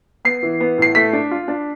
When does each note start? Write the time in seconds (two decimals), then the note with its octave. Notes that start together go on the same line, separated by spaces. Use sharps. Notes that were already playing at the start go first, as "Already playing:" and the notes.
0.25 B3 C7
0.43 E3
0.60 B3
0.78 A2 C7
0.95 A3 B6
1.13 D4
1.31 F4
1.48 D4